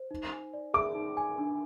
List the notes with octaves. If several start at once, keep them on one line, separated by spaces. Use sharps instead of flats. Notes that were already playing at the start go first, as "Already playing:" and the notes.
Already playing: C5
D#4
G#5
D5
G#4 D6
D#4
G#5
D4